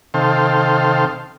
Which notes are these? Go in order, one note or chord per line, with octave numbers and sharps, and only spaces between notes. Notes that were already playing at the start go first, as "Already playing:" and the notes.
C3 D#3 A4 C5 F5 G5